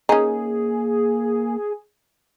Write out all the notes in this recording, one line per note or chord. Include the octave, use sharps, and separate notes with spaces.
A#3 C#4 D#4 G#4